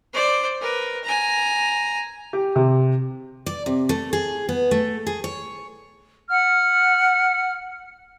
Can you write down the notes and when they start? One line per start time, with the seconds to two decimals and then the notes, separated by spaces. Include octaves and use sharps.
0.13 C5 D5
0.61 A#4 B4
1.04 G#5 A#5
2.33 G4
2.56 C3
3.46 D5
3.66 C3
3.89 A3
4.13 G#4
4.49 B3
4.71 A3
5.07 G#4
5.24 C#5
6.29 F#5 F6